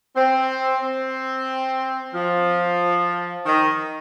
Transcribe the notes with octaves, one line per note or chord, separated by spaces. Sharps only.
C4
C4
F3
D#3